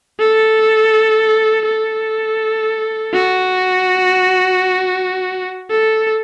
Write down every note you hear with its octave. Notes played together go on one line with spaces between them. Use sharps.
A4
A4
F#4
A4